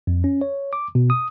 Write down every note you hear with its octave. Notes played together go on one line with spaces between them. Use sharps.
F2
C#4
C#5
D6
B2
D#6